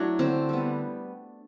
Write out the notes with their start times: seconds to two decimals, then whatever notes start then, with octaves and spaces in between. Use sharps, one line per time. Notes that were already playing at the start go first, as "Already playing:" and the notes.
Already playing: F#3 A3 D4 E4
0.19 D3 C4
0.49 G3 B3